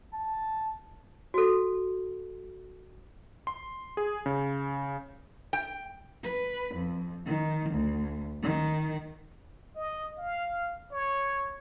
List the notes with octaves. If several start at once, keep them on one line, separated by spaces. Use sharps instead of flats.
A5
F#4 A4
C6
G#4
C#3
G5
B4
F2
D#3
D2
D#3
D#5
F5
C#5